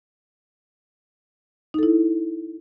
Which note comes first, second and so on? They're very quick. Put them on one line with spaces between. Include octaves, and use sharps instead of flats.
D#4 A4 E4